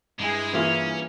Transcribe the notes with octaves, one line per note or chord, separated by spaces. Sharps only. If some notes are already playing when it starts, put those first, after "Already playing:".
G2 G#3 E4 G#4
E3 A#3 C#4 F4